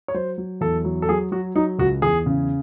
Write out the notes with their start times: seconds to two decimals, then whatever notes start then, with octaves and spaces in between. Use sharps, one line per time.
0.08 C#5
0.14 F#3 C5
0.38 F#3
0.61 E2 A4
0.85 F#3
1.02 A4
1.09 F#3 G#4
1.32 F#3 F#4
1.55 F#3 D#4
1.79 C#2 F#4
2.02 E2 G#4
2.26 C#3